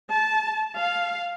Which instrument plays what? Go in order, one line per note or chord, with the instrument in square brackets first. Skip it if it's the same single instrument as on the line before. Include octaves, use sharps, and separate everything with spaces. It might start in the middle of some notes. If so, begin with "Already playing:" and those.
[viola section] A5
F5